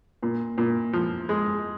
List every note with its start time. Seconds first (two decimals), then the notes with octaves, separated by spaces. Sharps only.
0.23 A#2
0.58 A#2
0.93 F3
1.29 G#3